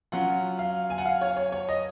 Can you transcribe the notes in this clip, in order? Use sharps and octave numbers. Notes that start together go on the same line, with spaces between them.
F#3 C#4 F4 F#5
F5
G#5
F#5
F5
C#5
C#5
C#5
D#5